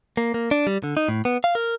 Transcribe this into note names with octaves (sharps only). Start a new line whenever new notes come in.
A#3
A#3
D4
G3
D3
D#4
A2
B3
F5
A#4